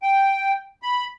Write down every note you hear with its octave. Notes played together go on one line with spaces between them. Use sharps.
G5
B5